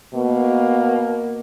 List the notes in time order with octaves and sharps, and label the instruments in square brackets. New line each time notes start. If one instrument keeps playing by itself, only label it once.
[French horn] B2 [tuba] A#3